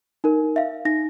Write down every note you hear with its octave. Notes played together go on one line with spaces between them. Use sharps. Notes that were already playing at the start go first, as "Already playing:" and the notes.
D#4 A#4
E5 F5
D#4 A#6